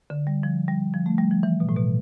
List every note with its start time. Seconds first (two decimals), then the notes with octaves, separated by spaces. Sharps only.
0.10 D3
0.27 G3
0.43 F3
0.68 G3
0.94 F3
1.06 A3
1.18 G3
1.31 F3
1.43 E3
1.60 B2
1.69 A2
1.77 B2